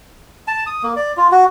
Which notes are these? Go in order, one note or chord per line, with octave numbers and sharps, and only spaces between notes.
A5
D#6
A#3
D5
F4
F#4